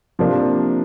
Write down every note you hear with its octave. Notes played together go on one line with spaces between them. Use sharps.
C3 F3 A#3 D4